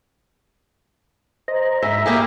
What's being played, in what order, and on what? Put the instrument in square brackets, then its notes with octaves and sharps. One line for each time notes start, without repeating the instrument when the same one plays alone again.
[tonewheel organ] C5 D#5 A#5
[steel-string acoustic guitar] G#2 [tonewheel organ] E5 A#5 B5
[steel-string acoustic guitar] A#3 G4 G#4